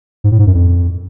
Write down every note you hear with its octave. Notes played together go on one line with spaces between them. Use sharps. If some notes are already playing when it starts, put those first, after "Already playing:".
G#2
A2
G#2
F#2
F2